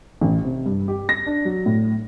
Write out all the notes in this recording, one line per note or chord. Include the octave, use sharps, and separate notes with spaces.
A1
C3
G2
G4
A#6
D4
F#3
A2